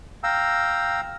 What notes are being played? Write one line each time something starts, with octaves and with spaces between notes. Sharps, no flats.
F5 G5 A#5 E6